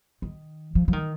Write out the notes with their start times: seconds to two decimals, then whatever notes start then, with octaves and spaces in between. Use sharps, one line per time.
0.22 D#3
0.75 F3
0.88 F3
0.93 D#3